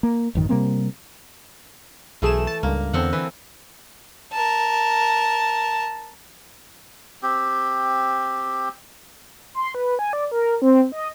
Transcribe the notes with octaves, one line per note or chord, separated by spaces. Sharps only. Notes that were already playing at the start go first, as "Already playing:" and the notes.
A#3
A1 F#2 D#3
C3 G3 A#3 C4
B1 E3 A3 G#4 E7
A5
C#2 G2 A#3
E2 D3 C4 F#5
E3 B4
A#4 A5
C4 G4
C6
B4
G#5
D5
A#4
C4
D#5